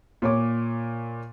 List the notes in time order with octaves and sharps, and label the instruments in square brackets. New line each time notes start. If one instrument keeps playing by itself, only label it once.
[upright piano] A#2 C#5 D6